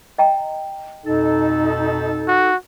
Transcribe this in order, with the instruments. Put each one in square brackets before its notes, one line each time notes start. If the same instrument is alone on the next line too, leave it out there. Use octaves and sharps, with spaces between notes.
[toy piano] D#5 G5 A#5
[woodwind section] F2 B2 A4 [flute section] D#4
[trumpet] F#4